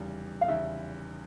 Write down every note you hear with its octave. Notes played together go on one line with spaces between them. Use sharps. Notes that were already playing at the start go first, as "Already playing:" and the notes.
Already playing: F1 E2 C#3 G3
F5
F1 E2 C#3 G3 E5